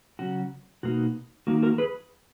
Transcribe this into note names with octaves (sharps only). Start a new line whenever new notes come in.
C#3 F#3 C#4 F#4
B2 A#3 D#4 F#4
D#3 A#3 D#4 F#4
F#4 A#4
G#4 B4